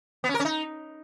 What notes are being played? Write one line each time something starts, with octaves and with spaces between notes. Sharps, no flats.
B3
C#4
A#4
C#4
D#4